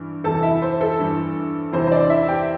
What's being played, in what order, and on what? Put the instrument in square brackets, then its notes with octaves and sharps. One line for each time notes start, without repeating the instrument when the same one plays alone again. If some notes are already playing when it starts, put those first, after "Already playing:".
Already playing: [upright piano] G2 E3
E2 C3 E3 A4 A5
E4 E5
C5
A4
G2 E3
E2 C3 E3 C5
C5
D4 D5
E4 E5
G4 G5